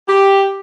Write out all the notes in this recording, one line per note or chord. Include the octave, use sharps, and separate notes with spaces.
G4